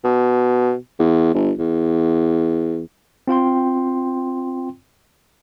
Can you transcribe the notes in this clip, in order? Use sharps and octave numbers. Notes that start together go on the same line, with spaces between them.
B2
E2
G1
E2
C4 F4 G5 C6